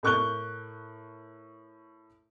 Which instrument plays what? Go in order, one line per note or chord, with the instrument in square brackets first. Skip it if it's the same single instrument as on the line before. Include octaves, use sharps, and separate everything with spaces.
[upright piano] A2 A#4 C#6 F#6 G6 G7